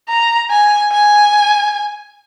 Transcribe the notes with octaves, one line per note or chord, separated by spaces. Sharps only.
A#5
G#5
G#5